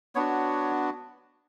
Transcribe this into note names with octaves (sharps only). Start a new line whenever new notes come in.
B3 D4 F#4 C#5